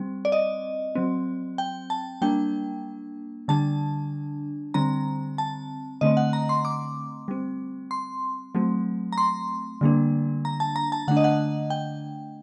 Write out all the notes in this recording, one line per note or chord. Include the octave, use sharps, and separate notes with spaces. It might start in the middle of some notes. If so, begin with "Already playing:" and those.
Already playing: G3 C4
D5
D#5
F#3 C4
G5
A5
G3 A#3 D4 G5
D3 G3 D4 A5
D3 G3 C4 A#5
A5
D3 A3 C4 D#5
F#5
A#5
C6
D6
G3 C4
C6
F#3 A3 C4
A#5
C6
D3 G3 A#3 D4
A#5
A5
A#5
A5
D3 A3 D4 F#5
D#5
F#5
G5